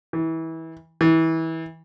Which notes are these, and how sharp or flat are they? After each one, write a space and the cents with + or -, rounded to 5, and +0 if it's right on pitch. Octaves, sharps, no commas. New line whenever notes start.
E3 -25
E3 -25